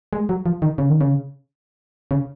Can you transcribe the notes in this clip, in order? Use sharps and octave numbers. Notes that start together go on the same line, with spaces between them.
G#3
F#3
F3
D#3
C#3
D#3
C#3
C#3